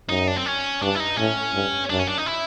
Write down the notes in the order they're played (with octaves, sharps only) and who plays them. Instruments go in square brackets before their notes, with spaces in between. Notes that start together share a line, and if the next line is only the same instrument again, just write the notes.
[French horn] F#2 [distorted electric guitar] D#4
[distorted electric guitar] D4
C4
C#4
[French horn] G2 [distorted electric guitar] D4
[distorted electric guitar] E4
D#4
[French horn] A2 [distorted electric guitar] C#4
[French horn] G2
[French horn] F#2 [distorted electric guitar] D4
[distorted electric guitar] C#4
D4
D#4
E4